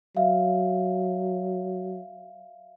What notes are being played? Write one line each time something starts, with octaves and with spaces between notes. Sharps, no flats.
F#3 E5 F5